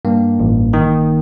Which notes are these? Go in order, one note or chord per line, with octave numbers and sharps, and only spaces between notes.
G2 A#3
A1
D#3